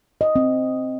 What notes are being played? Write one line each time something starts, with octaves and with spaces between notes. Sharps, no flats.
D#5
C4